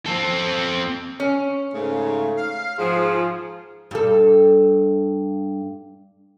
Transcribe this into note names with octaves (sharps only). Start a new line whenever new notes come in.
C4 A4
C#4
G#2 C#3 A3
F5
G#2 F3 G#4
G2 A4